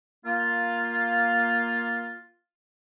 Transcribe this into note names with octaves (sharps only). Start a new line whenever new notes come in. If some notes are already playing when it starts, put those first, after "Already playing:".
A#3 F4